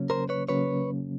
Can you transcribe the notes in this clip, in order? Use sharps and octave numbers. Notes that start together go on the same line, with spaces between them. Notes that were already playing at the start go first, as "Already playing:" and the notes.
Already playing: C#3 F#3 A#3 C#4
A#4 C5
B4 C#5
C#3 F#3 A#3 C#4 B4 C#5